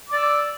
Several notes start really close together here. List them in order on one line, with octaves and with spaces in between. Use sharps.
D6 D5 E6